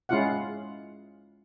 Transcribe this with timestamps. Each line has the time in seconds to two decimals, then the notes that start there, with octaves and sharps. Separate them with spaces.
0.09 G#3 C#4 E4 F4 F5 F#5